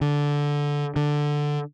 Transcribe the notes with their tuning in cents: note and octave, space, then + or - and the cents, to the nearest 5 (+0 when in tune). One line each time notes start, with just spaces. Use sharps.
D3 -10
D3 +5